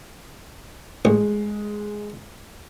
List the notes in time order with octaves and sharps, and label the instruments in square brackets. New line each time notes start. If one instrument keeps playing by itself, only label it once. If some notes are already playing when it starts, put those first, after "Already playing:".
[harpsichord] A1 [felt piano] G#3